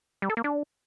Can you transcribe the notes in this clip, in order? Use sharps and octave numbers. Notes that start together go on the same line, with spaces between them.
G3
A4
A#3
D4